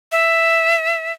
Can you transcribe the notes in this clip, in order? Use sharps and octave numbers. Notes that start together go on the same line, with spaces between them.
E5